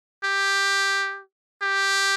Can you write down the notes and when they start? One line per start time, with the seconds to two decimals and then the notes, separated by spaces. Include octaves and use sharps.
0.24 G4
1.62 G4